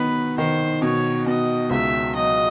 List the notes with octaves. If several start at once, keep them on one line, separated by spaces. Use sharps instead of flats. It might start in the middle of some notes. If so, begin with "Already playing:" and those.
Already playing: D#3 F#3 B3 B4
D#3 C5
B2 C#5
B2 D#5
C#2 E5
F#3 D#5